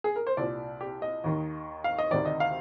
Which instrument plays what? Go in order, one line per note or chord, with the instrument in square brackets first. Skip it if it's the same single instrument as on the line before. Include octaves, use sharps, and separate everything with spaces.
[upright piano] G#4
A#4
C5
C2 A#2 D5
G4
D#5
D#2 D#3
F5
D#5
D2 C3 D#3 D5
D#5
F5